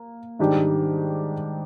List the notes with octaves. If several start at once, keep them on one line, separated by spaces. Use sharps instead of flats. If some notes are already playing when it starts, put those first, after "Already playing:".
Already playing: A#3
G#2 D#3 G3 D4 G4